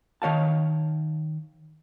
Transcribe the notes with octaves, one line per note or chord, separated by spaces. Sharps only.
D#3 C#5 F5 A5